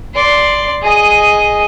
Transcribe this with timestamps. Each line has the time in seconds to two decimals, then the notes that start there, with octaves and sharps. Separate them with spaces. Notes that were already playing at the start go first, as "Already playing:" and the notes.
0.14 D5 C6
0.82 G#4 D#5